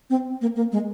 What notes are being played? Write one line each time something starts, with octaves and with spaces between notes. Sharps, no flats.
C4
A#3
A#3
G#3